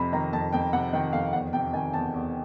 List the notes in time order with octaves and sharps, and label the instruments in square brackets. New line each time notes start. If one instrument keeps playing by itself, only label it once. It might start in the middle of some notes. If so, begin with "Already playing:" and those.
Already playing: [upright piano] F2 C3 B5
D#3 A#5
F2 A5
F2 G5
C3 F#5
D#3 G5
F2 F5
E2 F#5
C3 G5
D#3 G#5
E2 A5
E2